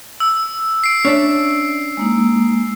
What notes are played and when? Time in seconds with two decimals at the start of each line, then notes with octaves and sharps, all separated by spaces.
0.20 E6
0.84 C7 D7
1.05 C#4 D4 E5
1.97 G#3 A#3 D#4